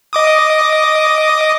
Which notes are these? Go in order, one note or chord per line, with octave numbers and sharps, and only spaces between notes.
D#5 D6 D#6